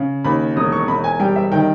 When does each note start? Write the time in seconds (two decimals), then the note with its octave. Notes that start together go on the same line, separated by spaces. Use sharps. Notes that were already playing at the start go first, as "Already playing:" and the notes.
Already playing: C#3
0.24 D#2 B5
0.56 E1 D#6
0.72 C#6
0.88 E1 B5
1.04 G#5
1.20 G3 G5
1.36 E5
1.52 D#3 G5